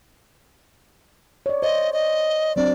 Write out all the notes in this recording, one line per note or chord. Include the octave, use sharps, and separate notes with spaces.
C#5 D5
C5 D#5
D#5
F#3 C4 D4 D5